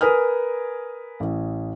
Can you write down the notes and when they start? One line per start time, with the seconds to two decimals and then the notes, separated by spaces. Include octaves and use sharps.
0.01 A#4 B4 G#5 D#6 F6
1.20 A1